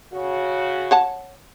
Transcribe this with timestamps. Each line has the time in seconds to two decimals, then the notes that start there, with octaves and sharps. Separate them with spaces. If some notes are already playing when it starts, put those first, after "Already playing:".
0.12 C#3 F#4
0.91 C#5 F#5 A5